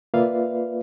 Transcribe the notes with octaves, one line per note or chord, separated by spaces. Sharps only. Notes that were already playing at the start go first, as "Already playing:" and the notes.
A#3 F4 B4 D5 E5 F5